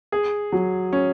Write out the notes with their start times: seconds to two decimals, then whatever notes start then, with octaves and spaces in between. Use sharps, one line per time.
0.12 G#4
0.52 F#3
0.93 C#4